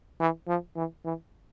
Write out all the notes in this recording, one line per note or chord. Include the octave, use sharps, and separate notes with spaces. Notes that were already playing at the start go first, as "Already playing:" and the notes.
E3
F3
E3
E3